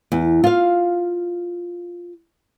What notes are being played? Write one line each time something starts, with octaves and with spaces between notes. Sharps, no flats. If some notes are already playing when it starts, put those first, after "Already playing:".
E2
F4 F5